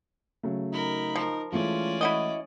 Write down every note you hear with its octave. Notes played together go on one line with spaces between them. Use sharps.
C#3 F#3 A3
D#4 A#4 B5
F3 A#4
E3 G#3 A3 C#4 F4 D5
E4 F#4 D#5